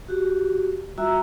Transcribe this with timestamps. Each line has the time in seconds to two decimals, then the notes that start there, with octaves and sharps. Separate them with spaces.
0.08 F#4 G4
0.98 G3 F4 F#4 E5 A#5 E6